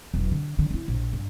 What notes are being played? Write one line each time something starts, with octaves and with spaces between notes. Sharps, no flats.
E1 B1
D3
D3
D4 E4
A#1
G2